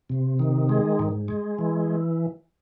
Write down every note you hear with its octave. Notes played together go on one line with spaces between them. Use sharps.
C3
D#3
G#3
G#2
G#3
E3